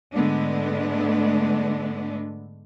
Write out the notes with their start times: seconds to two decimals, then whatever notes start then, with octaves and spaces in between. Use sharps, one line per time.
0.14 G#2 D3 G#3 A3 B3 D4